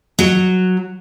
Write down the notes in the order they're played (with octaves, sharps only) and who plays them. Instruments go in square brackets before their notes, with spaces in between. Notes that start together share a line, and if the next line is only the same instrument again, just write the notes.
[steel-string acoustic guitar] F#3